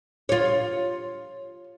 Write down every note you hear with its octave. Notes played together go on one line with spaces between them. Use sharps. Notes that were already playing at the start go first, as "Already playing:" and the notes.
F4 C#5